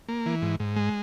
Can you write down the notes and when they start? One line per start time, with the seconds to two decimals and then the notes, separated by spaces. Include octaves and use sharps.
0.09 A#3
0.26 E3
0.42 G#2
0.60 G#2
0.76 G#3